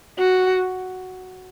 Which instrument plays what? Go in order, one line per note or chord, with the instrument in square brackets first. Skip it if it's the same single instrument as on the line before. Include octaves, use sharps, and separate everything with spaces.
[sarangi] F#4